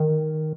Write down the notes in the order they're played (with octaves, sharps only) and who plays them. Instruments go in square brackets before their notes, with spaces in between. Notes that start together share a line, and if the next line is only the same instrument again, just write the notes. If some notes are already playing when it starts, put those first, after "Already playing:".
Already playing: [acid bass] D#3